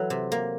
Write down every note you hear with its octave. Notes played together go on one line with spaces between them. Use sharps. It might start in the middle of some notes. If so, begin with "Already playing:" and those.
Already playing: E3 F#3 A4 B4
C3
A#3